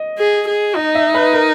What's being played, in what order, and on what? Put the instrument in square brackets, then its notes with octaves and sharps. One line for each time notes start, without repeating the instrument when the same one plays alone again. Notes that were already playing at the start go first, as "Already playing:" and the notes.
Already playing: [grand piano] D#5
[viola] G#4
G#4
[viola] D#4 [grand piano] D#5
[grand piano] E5
B4
A#4